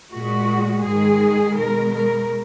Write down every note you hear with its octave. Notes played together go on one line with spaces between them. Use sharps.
A#2 G#3 F#4
G#2 D#3 G#3 G#4
B2 G#3 A#4
A#4